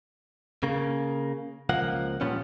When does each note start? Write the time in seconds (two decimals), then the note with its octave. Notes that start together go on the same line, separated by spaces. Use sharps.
0.63 C#3 A#3
1.70 C#2 F3 A#3 F#5
2.21 A#2 F3 G3 B3 C#4